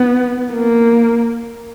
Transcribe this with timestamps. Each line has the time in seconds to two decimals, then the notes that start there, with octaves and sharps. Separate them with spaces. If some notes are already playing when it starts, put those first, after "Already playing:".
Already playing: B3
0.53 A#3